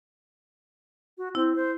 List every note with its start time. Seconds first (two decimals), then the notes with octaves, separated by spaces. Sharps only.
1.18 F#4
1.35 C4 E4
1.56 C5